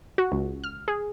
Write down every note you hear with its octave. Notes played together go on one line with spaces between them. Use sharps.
F#4
C#2
F6
G#4